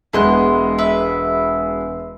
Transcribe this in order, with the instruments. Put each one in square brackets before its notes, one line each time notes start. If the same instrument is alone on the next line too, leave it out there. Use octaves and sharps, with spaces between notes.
[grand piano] E1 G#3 B3 [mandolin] E4 C6 F#6
[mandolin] B4 E5